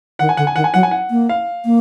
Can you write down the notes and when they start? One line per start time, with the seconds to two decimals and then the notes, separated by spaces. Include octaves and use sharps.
0.19 D#3 F#5
0.29 G#5
0.37 D3 F#5
0.47 G#5
0.55 D#3 F#5
0.64 G#5
0.74 F#3 F#5
0.83 G#5
0.91 F#5
1.10 A#3
1.29 F5
1.65 A#3